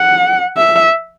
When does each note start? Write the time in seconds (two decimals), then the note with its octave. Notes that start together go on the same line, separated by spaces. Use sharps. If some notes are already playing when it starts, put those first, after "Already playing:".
Already playing: F#5
0.57 E5